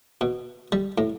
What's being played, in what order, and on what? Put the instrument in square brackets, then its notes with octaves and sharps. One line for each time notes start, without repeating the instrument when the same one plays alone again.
[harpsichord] B2
G3
A2